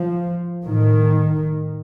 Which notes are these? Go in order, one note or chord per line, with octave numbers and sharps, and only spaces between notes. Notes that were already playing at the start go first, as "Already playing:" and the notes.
Already playing: F3
A2 D#3